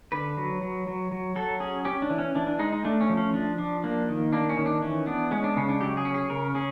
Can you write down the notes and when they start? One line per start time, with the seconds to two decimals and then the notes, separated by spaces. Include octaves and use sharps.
0.12 D3 B4
0.37 F#3
0.62 F#3
0.87 F#3
1.11 F#3
1.36 F#3 A4
1.60 C#4 G#4
1.85 C#4 G4
2.02 D4
2.10 E3
2.18 C#4
2.35 E3 D4
2.47 D4
2.59 G#3 D#4
2.73 D#4
2.85 A3 D4
3.01 C#4
3.09 F3
3.17 C#4
3.33 F3 D4
3.58 F3 D4
3.84 A#3 D4
4.08 D#3
4.33 A#3 D4
4.49 C#4
4.57 D#3
4.66 D4
4.82 E3 C#4
5.06 B3 D4
5.31 G#3 C#4
5.44 D4
5.56 C#3 C#4
5.69 D4
5.81 F#3 G4
5.97 G#4
6.05 C#4
6.14 G#4
6.30 C#3 A#4
6.55 C#4 G#4